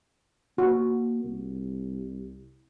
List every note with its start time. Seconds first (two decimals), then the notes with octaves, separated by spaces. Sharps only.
0.58 A#3 F#4
1.24 C2